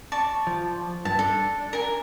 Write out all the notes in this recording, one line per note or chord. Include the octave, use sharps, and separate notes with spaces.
D5 A5 C#6
F3
G2 A5
D4 A4
A#4 G#5